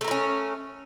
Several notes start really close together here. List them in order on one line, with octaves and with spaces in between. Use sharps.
A3 A#4 E4 C#4